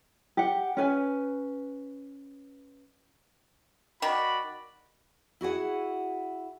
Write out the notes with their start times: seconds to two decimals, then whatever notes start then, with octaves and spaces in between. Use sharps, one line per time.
0.37 G4 F#5
0.77 C#4 B4 G#5
4.02 D#3 F#4 D5 B5
5.41 E4 F#4 G#4 F#5